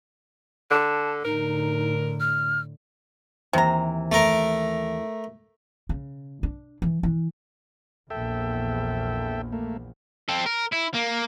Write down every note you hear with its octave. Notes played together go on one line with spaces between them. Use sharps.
D3 A5
A2 D3 D#4 A#4
F6
D#2 C3 E3 C5 A#5
A3 A#4
C#3
D4
E3
E3
A#1 E2 A4 E5 G5
A3 A#3
C4 A4
A#4
E4
A#3